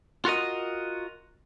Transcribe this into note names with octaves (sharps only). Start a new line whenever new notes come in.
F4 F#4 A#4 D#5